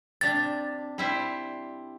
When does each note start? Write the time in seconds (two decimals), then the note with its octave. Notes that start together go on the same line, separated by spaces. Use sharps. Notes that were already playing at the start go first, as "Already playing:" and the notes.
0.21 C3 D4 A6
0.98 G3 E4 C5